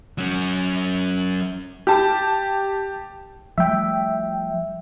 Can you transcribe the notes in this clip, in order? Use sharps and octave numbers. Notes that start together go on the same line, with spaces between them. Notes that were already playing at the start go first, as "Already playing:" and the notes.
F#3 C#4
G4 A5
F3 G3 A3 E5 G5